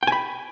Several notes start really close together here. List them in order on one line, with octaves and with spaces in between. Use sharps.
G5 G#5 B5